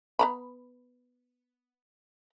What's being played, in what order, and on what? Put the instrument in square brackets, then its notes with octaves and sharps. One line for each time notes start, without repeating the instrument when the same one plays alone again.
[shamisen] B3 A#5 B5